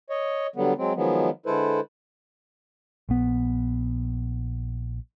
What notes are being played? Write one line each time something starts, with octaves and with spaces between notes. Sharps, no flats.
C#5 D#5
D3 F#3 G3 B3
F#3 G#3 C4
D#3 F3 F#3 G#3 B3
D3 G#3 E4 A4 B4 C5
A#1 B3